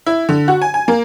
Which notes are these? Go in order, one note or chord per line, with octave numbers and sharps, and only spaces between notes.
E4
D3
F#4
G#5
G#5
A#3